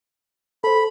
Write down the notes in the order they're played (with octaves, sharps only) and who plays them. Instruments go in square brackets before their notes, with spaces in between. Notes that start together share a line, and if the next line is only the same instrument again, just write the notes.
[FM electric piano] A4 C5 [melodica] B5